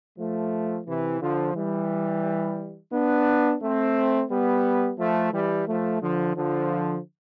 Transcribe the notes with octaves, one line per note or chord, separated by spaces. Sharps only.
F3 A3
C3 E3
D3 F3
E3 G3
B3 D4
A3 C4
G3 B3
F3 A3
E3 G3
F3 A3
D3 F3
D3 F3